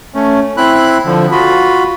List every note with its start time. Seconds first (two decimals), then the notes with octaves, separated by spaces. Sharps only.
0.14 A3 C#4
0.57 C4 E4 B5 F#6
1.05 D3 F3
1.32 F4 F#4 B5